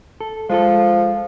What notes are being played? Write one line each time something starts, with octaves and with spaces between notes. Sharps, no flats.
A4
F3 G#3 F4 A4